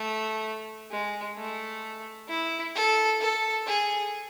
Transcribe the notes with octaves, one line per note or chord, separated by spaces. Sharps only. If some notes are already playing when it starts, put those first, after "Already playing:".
Already playing: A3
G#3
A3
E4
A4
A4
G#4